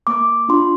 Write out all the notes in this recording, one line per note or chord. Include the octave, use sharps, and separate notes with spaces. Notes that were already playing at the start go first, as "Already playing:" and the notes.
A#3 D6
D4 F4 C6